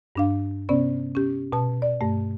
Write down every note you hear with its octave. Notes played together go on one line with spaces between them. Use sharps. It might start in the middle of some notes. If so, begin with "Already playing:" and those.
G2 D4 F5
C3 B3 C#4 D5
C#4 G4
B2 A5
D5
G2 A3